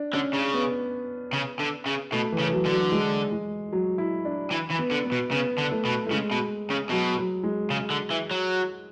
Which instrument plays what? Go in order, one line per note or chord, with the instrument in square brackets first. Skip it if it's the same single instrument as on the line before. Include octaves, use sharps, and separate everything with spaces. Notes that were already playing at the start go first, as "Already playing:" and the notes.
Already playing: [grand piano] D4
[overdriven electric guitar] D3 [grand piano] C#4
[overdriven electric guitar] C#3
[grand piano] B3
[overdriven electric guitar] C#3
D3
C#3
[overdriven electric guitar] B2 [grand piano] A3
[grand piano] E3
[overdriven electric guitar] C#3
[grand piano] E3
F#3
[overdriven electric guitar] D3
[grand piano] F#3
G#3
G#3
F#3
E4
D4
[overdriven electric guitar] E3
E3
[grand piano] B3
[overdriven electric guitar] D3
[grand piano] B3
[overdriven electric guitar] B2
[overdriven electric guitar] C#3 [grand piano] B3
[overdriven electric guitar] D3
[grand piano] A3
[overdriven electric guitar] B2
[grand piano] A3
[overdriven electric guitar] C#3 [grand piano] G#3
[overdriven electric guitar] B2
C#3
[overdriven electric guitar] B2 [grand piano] F#3
[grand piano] F#3
G#3
[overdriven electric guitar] C#3
D3
E3
F#3